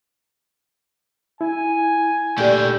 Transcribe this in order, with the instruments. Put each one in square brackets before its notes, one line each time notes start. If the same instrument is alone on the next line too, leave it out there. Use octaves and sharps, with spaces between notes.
[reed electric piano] E4 [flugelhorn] G#5
[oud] D2 D4 [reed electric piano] A#2 G4 [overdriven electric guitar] A3 G5